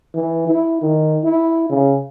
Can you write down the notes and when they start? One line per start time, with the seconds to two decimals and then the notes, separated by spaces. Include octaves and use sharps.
0.14 E3
0.47 E4
0.82 D#3
1.24 E4
1.70 C#3